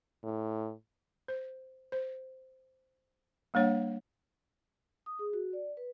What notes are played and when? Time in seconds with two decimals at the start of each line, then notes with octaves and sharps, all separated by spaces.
0.23 A2
1.28 C5
1.92 C5
3.54 G3 A#3 D4 C#5 F#5
5.06 D#6
5.19 G#4
5.33 F#4
5.53 D5
5.77 B4